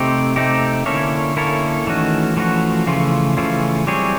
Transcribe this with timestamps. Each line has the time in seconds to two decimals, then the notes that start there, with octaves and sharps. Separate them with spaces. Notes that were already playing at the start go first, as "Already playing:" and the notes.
Already playing: C3 A3 C4 D#4 G4
0.36 A3 C4 D#4 G4
0.86 D3 A#3 C#4 E4 A4 C#5
1.37 A#3 C#4 E4 A4 C#5
1.87 D#3 E3 A3 C#4 F#4
2.36 E3 F3 A3 C#4 F#4
2.87 C#3 E3 A3 C#4 F4
3.37 C#3 E3 A3 C#4 F4
3.87 F#3 G3 C4 E4 G#4 C#5